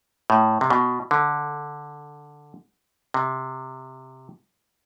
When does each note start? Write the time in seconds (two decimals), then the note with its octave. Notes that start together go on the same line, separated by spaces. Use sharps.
0.30 A2
0.61 C3
0.70 B2
1.11 D3
3.14 C3